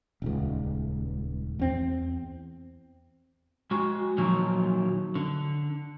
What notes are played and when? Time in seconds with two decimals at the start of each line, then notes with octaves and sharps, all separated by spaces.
0.22 D#1 C#2
1.59 E2 C4
3.71 G#3 F#4
4.18 A#2 D#3 F3 F#3
5.15 D3